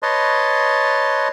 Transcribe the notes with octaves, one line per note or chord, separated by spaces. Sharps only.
B4 C#5 D#5 A5 C6